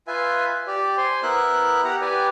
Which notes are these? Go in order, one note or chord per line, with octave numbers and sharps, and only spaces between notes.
F4 B4 E5 G#5
G4 D5
C5 G#5 C6
B3 E4 A#4 E5 F#6
G4 F#5 A#5
G4 B4 D5 G#5